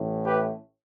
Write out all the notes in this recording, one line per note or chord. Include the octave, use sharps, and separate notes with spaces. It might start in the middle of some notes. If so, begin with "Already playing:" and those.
Already playing: A1 A2 E3
G4 B4